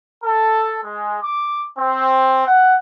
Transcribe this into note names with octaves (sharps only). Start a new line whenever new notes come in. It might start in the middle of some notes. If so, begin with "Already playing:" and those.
A4
G#3
D6
C4
F#5